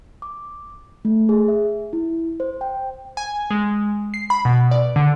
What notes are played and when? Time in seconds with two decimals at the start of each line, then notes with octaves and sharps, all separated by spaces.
0.22 D6
1.05 A3
1.29 G#4
1.48 E5
1.93 E4
2.40 C5
2.61 G5
3.17 G#5
3.51 G#3
4.14 C7
4.30 B5
4.45 B2
4.71 D5
4.96 D3